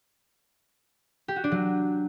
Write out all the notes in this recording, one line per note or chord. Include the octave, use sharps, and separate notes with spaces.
G4
F#4
D4
F#3